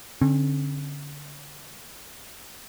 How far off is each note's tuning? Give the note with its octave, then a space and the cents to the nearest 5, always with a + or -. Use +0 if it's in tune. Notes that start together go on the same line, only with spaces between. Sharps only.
D3 -25 C4 +45